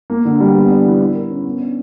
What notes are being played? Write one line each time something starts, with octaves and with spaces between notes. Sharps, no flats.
A#3
D3
G3
B3
D4
E3
E4
A#4
C#4
B3
D4